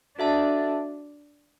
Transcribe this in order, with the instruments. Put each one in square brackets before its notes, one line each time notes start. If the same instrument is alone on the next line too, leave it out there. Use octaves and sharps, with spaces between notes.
[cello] D4 [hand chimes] F#4 A4 E5 A5